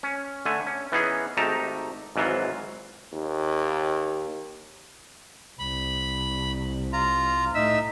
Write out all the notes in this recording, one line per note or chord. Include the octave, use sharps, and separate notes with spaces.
C#4
D3 A3 G#5
C#4
E3 B3 C#4 D#4 G#4
G#1 A3 D#4 G4 A5 A#5
G#1 G#2 E3 F#3 F4
D#2
C2 B5
F4 A#5
A2 D#4 E5 E6